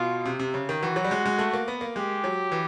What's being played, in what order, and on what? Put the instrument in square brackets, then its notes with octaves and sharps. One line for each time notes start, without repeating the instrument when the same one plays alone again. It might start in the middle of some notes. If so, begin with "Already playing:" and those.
Already playing: [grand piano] B2 [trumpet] F4
[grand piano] C3
C3
C#3
D#3
[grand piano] E3 [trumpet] F#4
[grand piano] F#3
G3
G#3
G#3
A3
A#3
B3
A#3
[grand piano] G#3 [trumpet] G4
[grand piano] F#3
E3